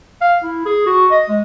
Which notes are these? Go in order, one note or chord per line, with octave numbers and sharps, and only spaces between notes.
F5
E4
G#4
F#4
D#5
G#3